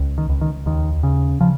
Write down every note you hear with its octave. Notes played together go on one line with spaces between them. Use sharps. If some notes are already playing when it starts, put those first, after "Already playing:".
Already playing: C#2
D#3
C#2
D#3
D#2 D#3
C#3
C#3 F3